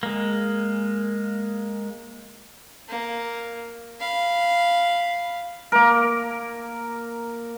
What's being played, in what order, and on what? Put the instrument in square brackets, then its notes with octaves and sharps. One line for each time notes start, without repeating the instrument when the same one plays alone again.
[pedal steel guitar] G#3 A#3
[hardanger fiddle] A#3
F5 B5
[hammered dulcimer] A#3 A#4